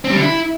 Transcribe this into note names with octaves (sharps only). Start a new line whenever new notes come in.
C4
G3
D3
E4